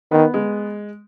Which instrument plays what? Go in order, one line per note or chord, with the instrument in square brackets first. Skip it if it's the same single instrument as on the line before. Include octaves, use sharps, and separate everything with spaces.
[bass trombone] D#3 [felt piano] B3
[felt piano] G#3